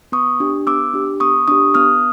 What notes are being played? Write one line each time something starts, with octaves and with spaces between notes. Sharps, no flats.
B3 C#6 D#6
D4 G4
B3 D6 E6
D4 G4
B3 C#6 D#6
D4 G4 C#6 D#6
B3 D#6 F6